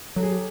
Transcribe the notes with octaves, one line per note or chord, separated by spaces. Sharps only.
F#3 A4
G#4
G4